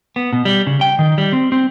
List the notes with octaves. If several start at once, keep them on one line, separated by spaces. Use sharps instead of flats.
B3
B2
G3
C#3
G5
D#3
G3
C4
C4